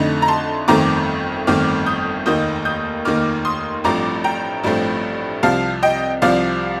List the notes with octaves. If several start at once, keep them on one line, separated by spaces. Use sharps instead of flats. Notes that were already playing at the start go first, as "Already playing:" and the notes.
Already playing: F2 D3 A3 D#4
A#5
A5 C6
G1 F2 D#3 A3 C4 A#5 D6
G1 F2 D#3 A3 C4 D6 F6
D#6 G6
F1 D#2 D#3 A#3 D#4 D#6 G6
D#6 G6
F1 D#2 D#3 A#3 D#4 D6 F6
C6 D#6
A1 G2 F3 A3 C4 A#5 D6
G5 A#5
A1 G2 F3 A3 C4
C2 C3 F3 F5 A5
D#5 G5
C2 C3 F3 D5 F5